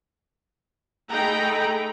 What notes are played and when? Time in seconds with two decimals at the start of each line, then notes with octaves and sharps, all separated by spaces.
1.10 A3 D#4 G#4 G5 A#5 B5